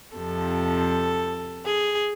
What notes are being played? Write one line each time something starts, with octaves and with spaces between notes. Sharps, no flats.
F2 C3 F3 A4
G#4